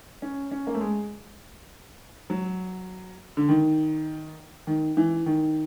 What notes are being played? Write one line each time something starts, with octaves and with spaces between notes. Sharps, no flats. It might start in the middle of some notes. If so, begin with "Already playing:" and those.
C#4
C#4
A#3
A3
G#3
F#3
D3
D#3
D#3
E3
D#3